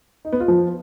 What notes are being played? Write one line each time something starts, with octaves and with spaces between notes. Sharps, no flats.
D#4
B3
F4
F3